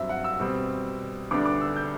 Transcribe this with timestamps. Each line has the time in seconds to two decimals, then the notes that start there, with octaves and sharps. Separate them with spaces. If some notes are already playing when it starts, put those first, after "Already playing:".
Already playing: G2 F#3 C4 E5
0.09 F#5
0.24 E6
0.40 B2 G3 C4
1.31 D2 D3 G3 B3 D4 D6
1.46 D6
1.61 E6
1.76 G6